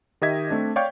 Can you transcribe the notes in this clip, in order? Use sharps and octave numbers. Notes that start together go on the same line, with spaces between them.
D#3 G4 D#5 E5 G#6 B6
A3 C4 D4
C#5 D5 F5 G5 C#6 G6